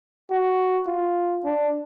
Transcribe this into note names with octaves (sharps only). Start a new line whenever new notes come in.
F#4
F4
D4